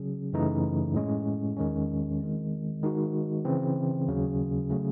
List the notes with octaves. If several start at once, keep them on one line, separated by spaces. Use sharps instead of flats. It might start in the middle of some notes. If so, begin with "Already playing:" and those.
Already playing: C#3 F#3 C#4 G#4
F#2 C#3 E3 A3 D#4
A2 G#3 C#4
E2 D#3 G#3 C#4
D#3 G#3 C4
D#3 G#3 D#4 F#4
C#3 E3 C4
D#2 C#3 F#3
C#3 F#3 A3 C#4